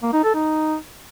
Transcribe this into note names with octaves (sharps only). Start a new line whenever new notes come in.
A#3
D#4
A4
D#4